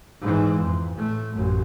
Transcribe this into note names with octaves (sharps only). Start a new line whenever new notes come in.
G#2 E3
F2
A2 A3
A1 F#2